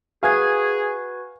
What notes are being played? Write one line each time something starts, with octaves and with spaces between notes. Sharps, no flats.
F#4 G#4 B4 F5 G#5 G#6